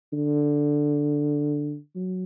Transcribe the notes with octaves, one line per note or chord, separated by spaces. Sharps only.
D3
F#3